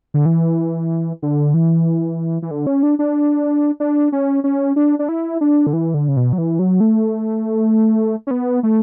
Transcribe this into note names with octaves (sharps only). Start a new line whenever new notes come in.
D3
E3
D3
E3
E3
D3
C#4
D4
D4
D4
C#4
C#4
D4
D4
E4
D4
D3
E3
D3
C#3
B2
F#3
E3
F#3
A3
C#4
B3
A3